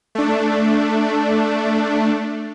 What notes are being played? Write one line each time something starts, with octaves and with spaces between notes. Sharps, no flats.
A3 D4